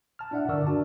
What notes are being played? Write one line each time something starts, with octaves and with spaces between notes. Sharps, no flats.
A5 F6
D4 E4 D5 E5 F#5
G2 D3 A#4 D5 C#6 E6
D4 F#4 A5